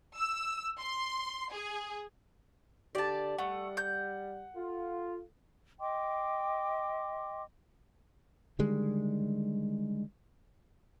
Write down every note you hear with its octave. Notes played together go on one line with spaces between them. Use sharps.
E6
C6
G#4
D3 G4 D5 A5
G3 A3 F#5
G6
F4 A4
D#5 G5 C6 D6
D3 D#3 G3 G#3